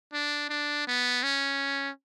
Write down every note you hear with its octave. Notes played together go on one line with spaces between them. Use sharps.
D4
D4
B3
C#4